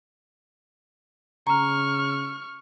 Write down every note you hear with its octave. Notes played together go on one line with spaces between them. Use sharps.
C#3 A#5 C#6 F6